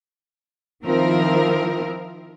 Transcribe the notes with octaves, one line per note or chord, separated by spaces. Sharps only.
D#3 F3 C4 E4 A#4